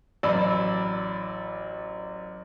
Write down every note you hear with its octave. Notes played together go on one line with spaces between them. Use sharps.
A1 F#3 D5 B5 E6